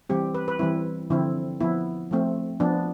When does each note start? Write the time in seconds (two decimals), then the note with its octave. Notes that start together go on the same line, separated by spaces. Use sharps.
0.09 E3 G3 C4 G4
0.35 B4
0.48 B4
0.59 E3 G3 C4 E4
1.10 D3 F3 C4 E4
1.60 F3 B3 E4
2.11 F3 A3 C4
2.60 F3 B3 D4